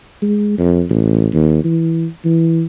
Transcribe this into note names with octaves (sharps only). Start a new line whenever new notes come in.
G#3
F2
A1
D#2
E3
E3